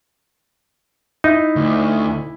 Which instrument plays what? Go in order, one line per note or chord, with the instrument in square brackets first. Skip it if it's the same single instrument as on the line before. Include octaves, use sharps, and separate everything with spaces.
[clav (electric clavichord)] D#4 [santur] E4
[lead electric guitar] D2